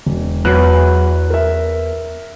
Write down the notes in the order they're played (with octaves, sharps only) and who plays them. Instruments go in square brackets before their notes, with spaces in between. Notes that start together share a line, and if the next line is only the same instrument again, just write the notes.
[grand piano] E1
[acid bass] E2 [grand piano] F#3 B4 F#6
[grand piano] A#4 E5